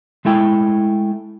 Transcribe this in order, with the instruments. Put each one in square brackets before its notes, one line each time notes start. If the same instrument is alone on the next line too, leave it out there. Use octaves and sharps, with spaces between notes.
[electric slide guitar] G#3 A3 E4 G5